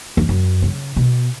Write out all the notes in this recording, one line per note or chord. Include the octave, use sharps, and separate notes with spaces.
E2
F#2
C#3
B2